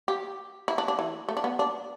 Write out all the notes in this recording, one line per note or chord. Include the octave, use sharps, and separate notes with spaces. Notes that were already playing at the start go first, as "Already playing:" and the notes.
G4
E4
D4
D4
E3
A3
D4
B3
D4